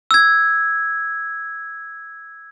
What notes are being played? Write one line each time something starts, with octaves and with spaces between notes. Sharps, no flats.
E6 G#6